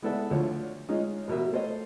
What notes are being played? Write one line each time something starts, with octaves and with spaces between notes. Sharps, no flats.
G#3 B3 E4 A4 D5 E5
D2 D3 F3 C#5
G#3 C#4 D#4 F4
A1 B2 A#4 E5
A3 C5 C#5 D#5